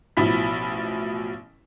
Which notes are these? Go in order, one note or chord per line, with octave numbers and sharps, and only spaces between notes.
A1 B2 F3 E4 B5 B6